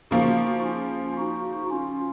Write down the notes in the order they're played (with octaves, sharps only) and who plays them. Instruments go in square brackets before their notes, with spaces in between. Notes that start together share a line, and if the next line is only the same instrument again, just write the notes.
[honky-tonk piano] C#3 F3 A#3 [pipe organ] D#4 F#4
[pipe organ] C#4 F4
D#4 F#4
C#4 F4